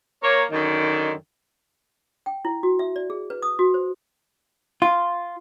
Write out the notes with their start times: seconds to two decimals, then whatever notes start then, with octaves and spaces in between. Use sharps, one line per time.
0.22 A#3 C#5
0.51 F#2 D3 D#3
2.26 G5
2.45 E4
2.63 F#4
2.79 E5
2.96 D5
3.10 G#4
3.30 B4
3.42 D#6
3.59 F#4
3.74 C5
4.82 F4